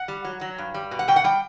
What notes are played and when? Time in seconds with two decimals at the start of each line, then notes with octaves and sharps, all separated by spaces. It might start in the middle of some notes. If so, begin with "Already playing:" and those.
Already playing: F#5
0.08 G3
0.25 F#3
0.41 F#3
0.58 G2
0.74 G3
0.91 B2
0.99 F#5
1.08 B2 G5
1.16 F#5
1.24 G3 G5